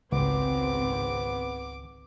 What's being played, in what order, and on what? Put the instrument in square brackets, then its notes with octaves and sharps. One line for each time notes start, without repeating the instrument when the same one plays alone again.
[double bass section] G#1 C#3 C4 [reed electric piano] C#2 [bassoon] B3 [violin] D6